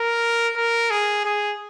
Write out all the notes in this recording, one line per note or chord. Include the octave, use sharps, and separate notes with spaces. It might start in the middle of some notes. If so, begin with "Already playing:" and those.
Already playing: A#4
A#4
G#4
G#4